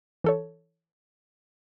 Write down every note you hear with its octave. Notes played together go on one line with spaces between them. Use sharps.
E3 A4 C#5